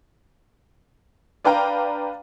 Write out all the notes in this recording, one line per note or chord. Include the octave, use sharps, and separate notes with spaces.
D4 B4 F5 G5 A#5